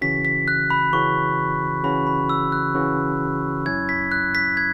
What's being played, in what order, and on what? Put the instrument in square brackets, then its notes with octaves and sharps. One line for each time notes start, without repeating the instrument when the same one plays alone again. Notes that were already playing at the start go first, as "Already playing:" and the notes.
[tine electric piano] C#3 E3 C#4 F#4 [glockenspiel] B6
[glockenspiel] B6
F#6
B5
[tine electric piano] C#3 E3 C#4 F#4 [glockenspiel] C#6
[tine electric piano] C#3 E3 C#4 F#4 [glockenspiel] B5
[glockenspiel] B5
E6
F#6
[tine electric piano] C#3 E3 C#4 F#4
[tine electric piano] F#2 F#3 C#4 E4 [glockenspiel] G#6
[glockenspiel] B6
F#6
B6
G#6